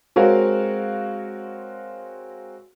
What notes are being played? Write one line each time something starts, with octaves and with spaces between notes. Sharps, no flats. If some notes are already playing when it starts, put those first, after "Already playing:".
G#3 C4 F#4 A#4 C#5 F5